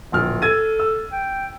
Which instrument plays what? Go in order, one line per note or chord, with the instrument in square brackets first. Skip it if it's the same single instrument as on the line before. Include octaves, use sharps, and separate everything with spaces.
[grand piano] D1 A#1 F6
[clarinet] A4 [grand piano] E6 G#6 D#7
[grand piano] E6
[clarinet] G5